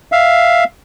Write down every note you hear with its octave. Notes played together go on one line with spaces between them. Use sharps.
E5 F5